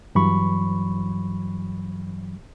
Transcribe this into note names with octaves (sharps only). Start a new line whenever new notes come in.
G2 E3 F#3 B5 C#6